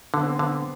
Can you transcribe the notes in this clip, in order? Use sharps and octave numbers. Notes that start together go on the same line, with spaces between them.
D3 B3
C4
B3
D3